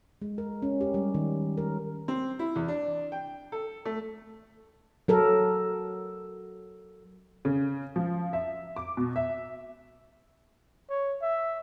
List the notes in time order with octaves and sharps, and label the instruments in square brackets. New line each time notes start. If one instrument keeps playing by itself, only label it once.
[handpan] G#3
A#4
C#4
G4
G3
D#3
A#4
[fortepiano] C4
E4
E2
D4
G5
A4
A3
[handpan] F#3 A4 A#4
[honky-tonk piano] C#3
F3
E5
D6
B2
E5
[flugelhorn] C#5
E5